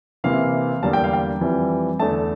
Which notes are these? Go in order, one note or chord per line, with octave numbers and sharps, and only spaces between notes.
C3 E3 A#3 F5
E2 D3 G3 A#3 A5
G5
F5
G5
F2 E3 G3
E2 D3 A3 A5